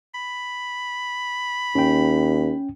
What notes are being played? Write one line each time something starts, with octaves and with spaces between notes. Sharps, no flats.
B5
D#2 C#4 G5